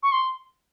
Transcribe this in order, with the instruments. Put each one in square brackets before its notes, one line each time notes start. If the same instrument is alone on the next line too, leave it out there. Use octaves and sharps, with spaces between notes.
[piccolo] C#6
C6